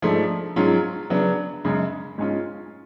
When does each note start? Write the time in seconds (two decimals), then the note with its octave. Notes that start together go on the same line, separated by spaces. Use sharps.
0.02 G#2 F3 A3 D4
0.56 G#2 F#3 C#4 F4
1.10 C#3 F#3 B3 D4
1.65 F#2 C#3 G#3
2.18 G#2 G#3 C#4 F4